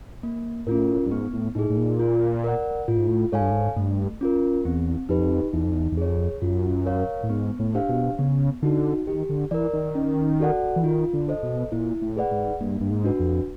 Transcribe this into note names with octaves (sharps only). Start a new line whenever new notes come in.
A#3
A2 C#4 F4 A#4
G2
G#2 B3
A2
A2 D#4 G#4
A2
A#2
F4
A#4 D5 F#5
A2 F4
G#2
A2
G#2 A4 C#5 F5 G#5
G2
G#2
G2 A3
C#4 F4 A#4
E2 C4
F2 D#4 G4 B4
E2 D#4
F2
E2
E2
F2 G#4 C#5
F#2 F4
A#4 C#5 F5
A2
G#2 B3
A2
D4 G4 C5 F5
B2
C#3 B3
D3 D#4 F#4
D#3 G4
D3
E3 A#4 D5
D#3
C#4
F#4 A4 D5 F#5
E3
D#3 F4
D3
A4 C5 D#5
B2
A#2 E4
A2
G#4 B4 D5 F#5
G#2
G2 A#3
G2
G#2
D4 F#4 B4
F2